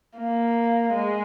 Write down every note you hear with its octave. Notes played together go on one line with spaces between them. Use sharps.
A#3
G#3